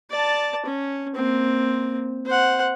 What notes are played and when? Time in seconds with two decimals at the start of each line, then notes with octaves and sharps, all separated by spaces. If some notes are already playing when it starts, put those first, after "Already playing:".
0.10 D5 A5
0.66 C#4
1.16 A#3 C4
2.26 C5 F#5